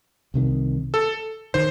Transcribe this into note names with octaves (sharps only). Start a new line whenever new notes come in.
C2 C3 D#3
A4
D#3 C5